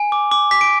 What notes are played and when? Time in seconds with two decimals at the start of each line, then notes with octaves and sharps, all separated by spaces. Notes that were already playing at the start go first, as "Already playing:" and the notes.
Already playing: G#5
0.12 D6
0.32 D6
0.51 D6 B6
0.61 D7